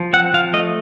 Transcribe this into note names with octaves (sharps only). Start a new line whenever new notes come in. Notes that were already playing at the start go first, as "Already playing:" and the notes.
Already playing: F3
C4 F#5
F3 F5
A3 D#5